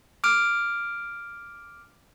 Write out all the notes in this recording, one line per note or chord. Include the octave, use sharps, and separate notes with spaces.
D6 F6 D7